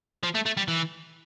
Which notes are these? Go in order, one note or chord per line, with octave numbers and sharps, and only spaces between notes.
F3
A3
A3
G3
E3